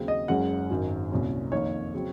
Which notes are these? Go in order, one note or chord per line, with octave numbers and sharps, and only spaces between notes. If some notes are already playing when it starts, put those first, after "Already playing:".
Already playing: D#2 C#3 F#3 C4
D#5
F#1 F#2 C#3 G#3 C#4 F#5
G#1 F#2 D#3 F#3
C2 A#2 F#3 C#4
F2 D#3 A#3 C#5
C#3 F#3 C4